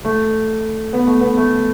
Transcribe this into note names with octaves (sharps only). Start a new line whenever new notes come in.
A3
B3
A3
B3
A3